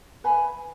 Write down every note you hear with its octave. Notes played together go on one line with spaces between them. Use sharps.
B4 E5 G#5 B5